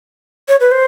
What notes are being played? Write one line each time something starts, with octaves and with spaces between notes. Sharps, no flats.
C#5
B4
C5